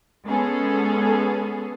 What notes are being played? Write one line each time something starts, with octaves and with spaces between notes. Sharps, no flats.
G#3 B3 C#4 G#4 A4